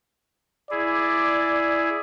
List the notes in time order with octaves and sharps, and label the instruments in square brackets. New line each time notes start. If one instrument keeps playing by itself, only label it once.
[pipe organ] E4 G#4 [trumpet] D5